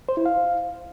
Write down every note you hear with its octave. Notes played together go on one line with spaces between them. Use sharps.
C5
E4
F5